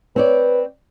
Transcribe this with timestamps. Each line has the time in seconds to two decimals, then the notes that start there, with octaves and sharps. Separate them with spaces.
0.16 C4 B4 C#5 D5